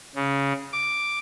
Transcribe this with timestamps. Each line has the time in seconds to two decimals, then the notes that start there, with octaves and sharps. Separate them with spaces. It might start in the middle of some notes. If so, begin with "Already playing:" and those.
0.15 C#3
0.72 D6